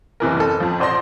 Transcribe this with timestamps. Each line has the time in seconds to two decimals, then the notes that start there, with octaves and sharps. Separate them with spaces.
0.20 F#1 C3 E3 A#4
0.37 F#1 A4
0.60 F2 F3
0.80 A1 C5 D5 C6 A#6